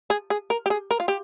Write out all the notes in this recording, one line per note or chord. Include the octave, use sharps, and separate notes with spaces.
G#4
G#4
A#4
G4
G#4
A#4
F4
G4